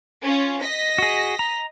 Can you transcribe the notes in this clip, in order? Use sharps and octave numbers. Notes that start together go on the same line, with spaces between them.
C#4 F4
D#5 A#6 B6
F#4 G#4
A#5